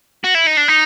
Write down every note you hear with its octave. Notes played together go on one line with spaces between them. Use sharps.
F#4
E4
D#4
D4
D#4